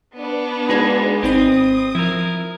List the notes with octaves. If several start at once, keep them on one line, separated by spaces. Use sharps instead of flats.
B3 D4
G#3 D#4 F#4 G#4 B4
G#1 C4 D#4 B5 D#6
F3 E4 A#4